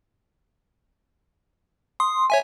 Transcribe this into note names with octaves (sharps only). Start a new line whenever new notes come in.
C6 D#6
C#5 E5 G#5